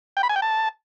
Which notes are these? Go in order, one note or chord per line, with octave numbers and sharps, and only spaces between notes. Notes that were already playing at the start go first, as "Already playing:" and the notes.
G5
B5
G#5
G5
A5